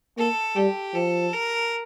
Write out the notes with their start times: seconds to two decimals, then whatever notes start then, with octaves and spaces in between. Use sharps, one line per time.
0.18 A#3 A4
0.56 G3 G4
0.94 F3 A4
1.33 A#4